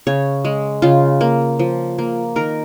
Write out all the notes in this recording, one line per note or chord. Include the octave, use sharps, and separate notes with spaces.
C#3 C#5
G#3
C#3 F4
A#3
F3
A#3
D#3 A#4